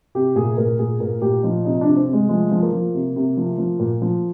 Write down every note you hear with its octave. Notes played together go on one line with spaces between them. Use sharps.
C3 G4
A#2 G#4
A#2 A#4
A#2 G#4
A#2 A#4
A#2 G4
F3 D#4
C3 D#4
D4
C3
C4
C3 G#3
F3 G#3
F3
A#3
F3
C3
C3
F3
F3
A#2
F3